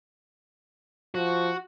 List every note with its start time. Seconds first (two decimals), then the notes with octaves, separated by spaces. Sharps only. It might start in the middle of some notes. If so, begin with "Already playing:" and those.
1.14 F3 F#4